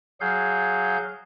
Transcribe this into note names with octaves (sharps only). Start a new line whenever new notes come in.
F#3 G#4 F5 G6